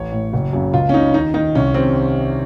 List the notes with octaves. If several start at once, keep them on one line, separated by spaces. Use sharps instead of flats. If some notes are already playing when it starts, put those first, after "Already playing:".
Already playing: A1 C#5
A2
F#1
F#2 C#3
C#2 F4
C#4
C#3 D#4
D#2 D#4
D#3 D#4
C2 C#4
C3 D#3 C4